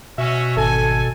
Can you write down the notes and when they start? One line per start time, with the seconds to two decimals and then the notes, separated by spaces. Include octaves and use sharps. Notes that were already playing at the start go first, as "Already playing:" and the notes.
0.18 B2 C#4 F#4 E5
0.57 G#1 A4 G#5